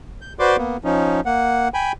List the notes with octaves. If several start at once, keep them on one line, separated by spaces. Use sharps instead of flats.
G6
F#4 B4 C5 D5 C6 D6
A#3 B3
F3 C#4 D#4
A#3 F#5
G5 G#5 B5